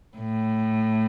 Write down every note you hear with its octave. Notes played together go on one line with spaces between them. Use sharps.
A2